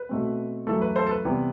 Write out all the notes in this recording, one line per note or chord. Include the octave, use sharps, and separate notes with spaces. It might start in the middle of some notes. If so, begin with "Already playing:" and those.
Already playing: B4
B2 A3 C4
F#2 E3 A3 A4
B4
A4 C5
A4
B4
C3 E3 G3 B3